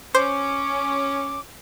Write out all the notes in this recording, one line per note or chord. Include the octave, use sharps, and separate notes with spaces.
C#4 C5 D6